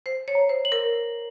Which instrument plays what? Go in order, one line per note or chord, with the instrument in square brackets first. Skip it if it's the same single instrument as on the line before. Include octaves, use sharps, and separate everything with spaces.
[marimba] C5 [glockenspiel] C7
[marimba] C#5
[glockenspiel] A#5
[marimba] C5
[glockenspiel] F#7
[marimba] A#4